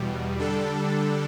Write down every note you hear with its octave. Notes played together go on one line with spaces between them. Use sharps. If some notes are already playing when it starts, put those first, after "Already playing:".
Already playing: E2 B2 G3
D3 G3 D4 A4